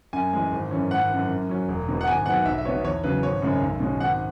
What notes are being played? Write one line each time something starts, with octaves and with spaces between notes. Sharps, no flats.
F#2 G#5
E3 G#3
G#1
F#2 E3 C#4
G#1 F#5
F#2 E3
F#2
F#3 C#4
E1
E2 B2 B3
F#5
G#1 G#5
G#2 F#3 B3 F#5
B1 E5
E5
B2 B3 C#5
E2 C#5
C#3 F#3 B3 B4
G#1 C#5
F#2 C#3 G#3 C#4
B1
B2 G#3 C#4
G#1 F#5